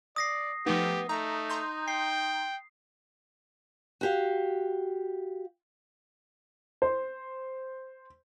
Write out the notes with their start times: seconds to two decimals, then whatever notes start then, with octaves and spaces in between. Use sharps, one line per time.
0.16 D5 D#6 A#6 C7
0.66 F3 A3 B3 D#4 G4
1.09 A3 D#4 A#5
1.49 A#5 C6 G6
1.88 G5 C7
4.01 F#4 G4 F5
6.82 C5